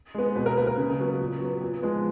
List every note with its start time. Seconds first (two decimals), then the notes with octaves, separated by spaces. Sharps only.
0.15 G#3 B3
0.35 B2 B4
0.46 A#4
0.57 A#3 B4
0.67 A#4
0.77 C#3
0.99 F#3 B3
1.20 A#2
1.40 F#3 B3
1.61 A#2
1.82 F3 G#3 B3